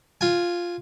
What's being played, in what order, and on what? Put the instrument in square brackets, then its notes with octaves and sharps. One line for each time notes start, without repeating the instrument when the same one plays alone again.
[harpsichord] F4 G#5